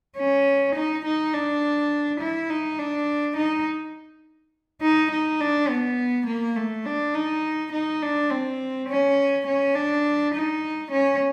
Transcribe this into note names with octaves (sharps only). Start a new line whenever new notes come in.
C#4
D#4
D#4
D4
E4
D#4
D4
D#4
D#4
D#4
D4
B3
A#3
A3
D4
D#4
D#4
D4
C4
C#4
C#4
D4
D#4
C#4